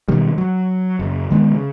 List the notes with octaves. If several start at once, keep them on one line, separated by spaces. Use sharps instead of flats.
B2 D#3 G3
F#3
F#1
D#3 G#3 B3
C#3